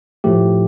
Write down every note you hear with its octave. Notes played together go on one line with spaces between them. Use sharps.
A2 F3 A3 G4